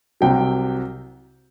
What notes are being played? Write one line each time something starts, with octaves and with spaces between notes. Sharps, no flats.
C2 C3 F#3 G5